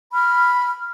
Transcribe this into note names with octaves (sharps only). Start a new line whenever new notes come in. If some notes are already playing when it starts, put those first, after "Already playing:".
B5 F6